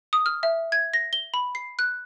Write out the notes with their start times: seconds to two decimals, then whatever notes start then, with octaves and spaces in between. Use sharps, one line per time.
0.13 D#6
0.26 F6
0.43 E5
0.72 G#6
0.94 A#6
1.13 G7
1.34 B5
1.55 C7
1.79 F#6